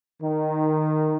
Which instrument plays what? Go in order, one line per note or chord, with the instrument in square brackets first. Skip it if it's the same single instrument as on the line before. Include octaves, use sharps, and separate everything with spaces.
[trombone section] D#3